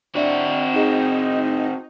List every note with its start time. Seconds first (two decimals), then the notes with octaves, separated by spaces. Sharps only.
0.15 C4 D4 F#4 D5 E5
0.72 D#4 G#4 E7